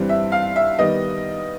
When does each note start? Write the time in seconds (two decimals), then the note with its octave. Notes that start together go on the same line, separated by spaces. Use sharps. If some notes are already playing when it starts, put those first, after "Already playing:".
Already playing: G2 E3 G3 C4
0.09 E5
0.32 F5
0.56 E5
0.78 D#3 G3 B3 D#4 D#5